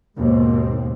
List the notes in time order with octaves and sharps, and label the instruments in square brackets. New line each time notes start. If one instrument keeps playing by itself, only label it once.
[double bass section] D#2 G#2 B2 C4